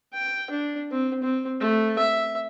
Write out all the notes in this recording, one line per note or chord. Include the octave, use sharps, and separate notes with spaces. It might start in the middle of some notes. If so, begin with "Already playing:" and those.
G5
D4
C4
C4
A3
E5